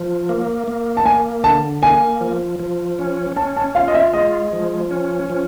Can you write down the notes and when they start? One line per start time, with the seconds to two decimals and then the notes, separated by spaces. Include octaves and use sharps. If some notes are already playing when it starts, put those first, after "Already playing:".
Already playing: F3
0.29 A#3
0.68 A#3
0.97 A5
1.05 A#3 G#5
1.44 D3 A5
1.82 A#3 G#5
2.21 F3
2.60 F3
2.99 C#4
3.36 C#4 A5
3.57 A5
3.75 F4 F5
3.88 D#5
3.94 E5
4.13 G#3 D#5
4.53 F3
4.91 C#4
5.30 F3